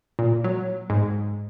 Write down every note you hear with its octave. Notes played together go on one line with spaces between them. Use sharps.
A#2
F#3
G#2